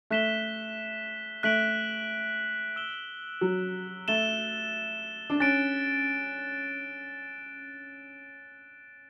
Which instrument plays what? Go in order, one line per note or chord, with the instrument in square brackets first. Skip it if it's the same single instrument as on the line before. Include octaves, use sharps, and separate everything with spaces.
[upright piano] A3 [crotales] F#6 B6 E7 G7
[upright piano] A3 [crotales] F#6 B6 D7 F#7
[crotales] E6 B6 E7 G7
[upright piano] F#3
[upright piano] A3 [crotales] A6 E7 G7
[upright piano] D4
[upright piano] C#4 [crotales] F#6 A6 D7